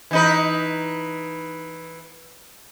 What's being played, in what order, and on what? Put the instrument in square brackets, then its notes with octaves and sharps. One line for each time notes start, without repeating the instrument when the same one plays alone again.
[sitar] E3 D#4 B4